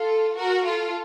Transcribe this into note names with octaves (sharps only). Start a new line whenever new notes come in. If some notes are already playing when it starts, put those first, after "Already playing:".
Already playing: F4 A4
F#4 A#4
F4 A4